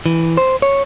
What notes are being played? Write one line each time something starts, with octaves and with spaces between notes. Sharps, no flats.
E3
C5
C#5